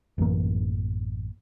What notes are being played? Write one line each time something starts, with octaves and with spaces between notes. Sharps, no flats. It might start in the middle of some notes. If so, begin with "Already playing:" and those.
A1 F#2 E3 A#3